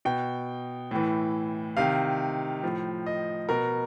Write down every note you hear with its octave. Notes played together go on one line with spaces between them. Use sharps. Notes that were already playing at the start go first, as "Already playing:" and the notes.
B2 G5
A2 E3
C3 D#3 F5
A2 F3
D#5
B2 A#4